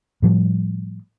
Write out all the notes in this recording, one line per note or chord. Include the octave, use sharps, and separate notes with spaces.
A2 F3 G3